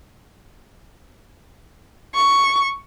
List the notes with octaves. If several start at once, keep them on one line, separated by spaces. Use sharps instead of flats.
C#6